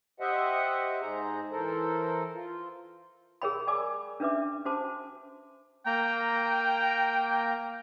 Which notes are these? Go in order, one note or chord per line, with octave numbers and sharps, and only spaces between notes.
G4 C5 D#5 E5 F#5
G#2 D#4 G#4 C5 A#5
E3 A4 A#4 C5
F4
G#4 A#4 C#5 G5 B5
D5 G#5 D6 E6
C#4 D4 B4 E5 D6
C#4 F#4 C5 G#5 A5 D6
A#3 G5 A#5